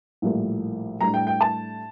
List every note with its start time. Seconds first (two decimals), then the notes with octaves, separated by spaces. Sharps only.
0.22 A#1 A2 G3 A#3
1.01 A2 G3 D4 A#5
1.14 G5
1.27 G5
1.41 A5